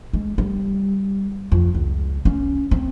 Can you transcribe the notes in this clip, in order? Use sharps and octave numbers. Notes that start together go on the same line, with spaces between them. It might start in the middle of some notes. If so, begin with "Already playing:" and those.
G#3
G3
F2
C#2
C#4
C4